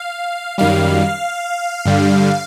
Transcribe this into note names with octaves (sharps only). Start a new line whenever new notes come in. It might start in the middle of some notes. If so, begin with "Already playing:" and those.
Already playing: F5
F#2 D#3 G3 F5
G2 D3 G3